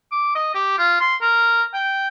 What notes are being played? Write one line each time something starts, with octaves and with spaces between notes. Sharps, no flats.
D6
D#5
G4
F4
C6
A#4
G5